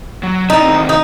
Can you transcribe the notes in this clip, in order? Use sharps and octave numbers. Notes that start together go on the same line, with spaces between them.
F#3
D#4 E4 D5
D#3 E3 C4
D#4